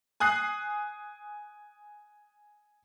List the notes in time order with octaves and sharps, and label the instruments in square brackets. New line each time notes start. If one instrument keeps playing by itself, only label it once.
[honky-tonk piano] G#5 D#6 F#6 C7